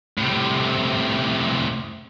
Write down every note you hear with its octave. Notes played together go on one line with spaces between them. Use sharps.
A2 C3